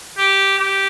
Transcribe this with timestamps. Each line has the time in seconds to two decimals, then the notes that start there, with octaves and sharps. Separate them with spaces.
0.18 G4
0.59 G4